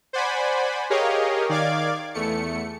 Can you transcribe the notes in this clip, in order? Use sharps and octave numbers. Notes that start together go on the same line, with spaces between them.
C5 D5 F#5 G#5 B5
G4 G#4 A#4 C#5 D#5 F5
D#3 D5 F5 D6 G#6
E2 A3 C#7